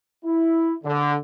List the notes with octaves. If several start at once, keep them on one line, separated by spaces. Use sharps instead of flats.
E4
D3